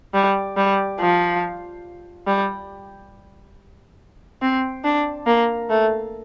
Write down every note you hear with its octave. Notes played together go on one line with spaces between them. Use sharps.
G3
G3
F3
G3
C4
D4
A#3
A3